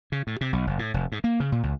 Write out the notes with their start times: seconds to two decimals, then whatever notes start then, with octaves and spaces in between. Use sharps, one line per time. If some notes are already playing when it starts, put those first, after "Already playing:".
0.12 C#3
0.27 A2
0.41 C3
0.53 B1
0.67 F#1
0.79 A2
0.94 F1
1.12 G#2
1.24 A#3
1.40 C#3
1.52 A#2
1.63 C#2